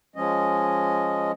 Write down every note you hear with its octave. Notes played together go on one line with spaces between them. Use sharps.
F3 G#3 C#4 D#5